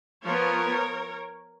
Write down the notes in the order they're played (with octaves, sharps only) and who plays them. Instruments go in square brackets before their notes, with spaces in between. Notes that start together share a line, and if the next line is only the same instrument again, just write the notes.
[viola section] F3 B3 A#4 C#5